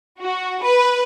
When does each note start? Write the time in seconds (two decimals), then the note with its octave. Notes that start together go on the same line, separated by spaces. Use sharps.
0.20 F#4
0.62 B4